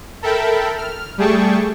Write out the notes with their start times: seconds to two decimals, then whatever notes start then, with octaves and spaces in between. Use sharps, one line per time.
0.22 A4 A#4 E5 G5 A5 B5
0.78 F6
1.18 G3 A3 G#4 G5 A5 C#6